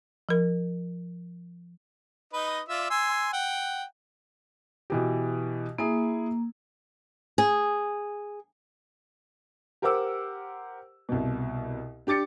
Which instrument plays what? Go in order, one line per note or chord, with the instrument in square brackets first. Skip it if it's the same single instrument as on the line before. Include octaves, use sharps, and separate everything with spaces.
[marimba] F3 A#4
[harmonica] D#4 B4 D#5
F4 D5 E5
G#5 C6 E6
F#5 G5
[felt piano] B2 E3 G4
[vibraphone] A#3 [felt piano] E4 G#4
[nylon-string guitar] G#4
[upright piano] G4 A#4 C5 F#5 D6 E6
C2 B2
D4 G4 D6 A6 C#7